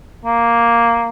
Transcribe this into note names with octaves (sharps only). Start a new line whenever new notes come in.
A#3